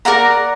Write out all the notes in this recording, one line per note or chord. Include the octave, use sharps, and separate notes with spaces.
A#4 D5 F#5 A#5